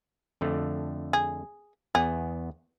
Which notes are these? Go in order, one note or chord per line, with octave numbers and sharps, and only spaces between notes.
F2 D3 A3
G#4
E2 B3 G#4